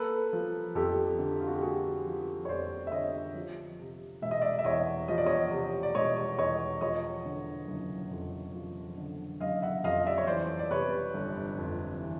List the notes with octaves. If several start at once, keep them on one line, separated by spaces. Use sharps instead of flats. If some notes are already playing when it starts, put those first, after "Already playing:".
Already playing: A#3 A4 B4
F3
F2 G4 A4
D3
F4
F#4
G4
A#3 F#4 G#4
F3
C#5
F2 C5 D5
E5
D3 C#5 D#5
F3
C3
E1 E5
D#5
D5 E5
E5
E2 C#5 D#5
F3 D#5
D5
C#5 D#5
C3
D5
E1 C#5 D#5
E2 C#5 D#5
F3 C#5 D#5
D3
F#1
F2
F3
D3
F#1 D#5 F5
E5 F#5
F2 D#5 F5
D5 E5
C#5
E3 C5 D5
D5
C3 B4 C#5
G1
F2
E3